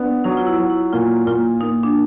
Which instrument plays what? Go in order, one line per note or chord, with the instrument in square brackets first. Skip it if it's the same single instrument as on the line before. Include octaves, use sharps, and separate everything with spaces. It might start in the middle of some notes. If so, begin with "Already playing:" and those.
Already playing: [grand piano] B3 D4
[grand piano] F#3 [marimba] D#4
[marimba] F4
E4
[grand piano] F#3
[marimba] E4
[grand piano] A#2 [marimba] F4
[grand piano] A#2 [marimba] F4
[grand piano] A#3 [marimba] D#4
[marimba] D4